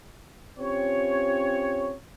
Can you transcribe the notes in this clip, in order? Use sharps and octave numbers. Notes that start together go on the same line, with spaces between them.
C4 C#4 F4 G4 C#5